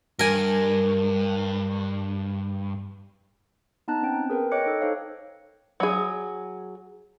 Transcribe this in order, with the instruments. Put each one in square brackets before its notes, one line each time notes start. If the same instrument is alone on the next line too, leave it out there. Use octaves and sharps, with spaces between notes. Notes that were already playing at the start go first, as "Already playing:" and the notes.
[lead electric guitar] G2 [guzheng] A#4 G#5
[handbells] B3 D#4 A5 A#5 F#6
C4 C#4 G5
G#4 A#4 B4 G5
C#5 D#5 G5 D6 F#6 C#7
D#4 A4
D#4 A4 C5 C#5 F5
[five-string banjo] F#3 G#4